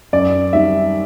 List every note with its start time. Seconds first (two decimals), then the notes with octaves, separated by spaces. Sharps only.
0.13 F#2 D5
0.52 D#3 G3 E5